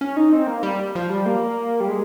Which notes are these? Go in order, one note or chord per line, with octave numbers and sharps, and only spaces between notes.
C#4
D#4
C4
A#3
G3
F3
G3
A#3
G3
G#3